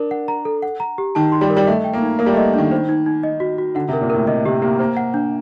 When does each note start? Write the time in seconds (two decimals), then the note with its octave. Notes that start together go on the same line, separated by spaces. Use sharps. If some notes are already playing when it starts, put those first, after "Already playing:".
Already playing: D4 A#4
0.11 F#5
0.28 A#5
0.45 A4
0.63 F#5
0.80 A#5
0.98 G4
1.15 D#3 A5
1.32 C6
1.41 G3
1.50 A#4
1.57 G3
1.67 A3 D#5
1.84 G5
1.93 A#3
2.02 D#4
2.19 A#3 A#4
2.26 G3
2.32 A3
2.37 D#5
2.54 D#3 D4
2.72 C5
2.89 D#4
3.06 D#4
3.23 D#5
3.40 F#4
3.58 F#4
3.75 D3 F#5
3.88 C3
3.93 A#4
4.01 A#2
4.10 A2 A#4
4.27 C3 D#5
4.45 C3 G4
4.62 A#3 G4
4.79 A#3 C5
4.97 F#5
5.14 D4